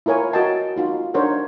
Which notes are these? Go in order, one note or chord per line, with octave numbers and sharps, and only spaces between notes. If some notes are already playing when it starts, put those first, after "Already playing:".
E4 F4 A#4 C#5 G#5
F#4 A#4 D#5 G5 A5 A#5
D#4 F4 F#4
D4 D#4 A#4 C5 C#5 F#5